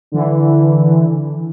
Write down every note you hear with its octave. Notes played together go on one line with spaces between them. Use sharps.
D3 E3